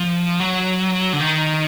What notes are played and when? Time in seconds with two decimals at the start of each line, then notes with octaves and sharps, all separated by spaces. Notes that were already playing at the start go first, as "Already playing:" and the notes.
Already playing: F3
0.40 F#3
1.13 D3
1.20 D#3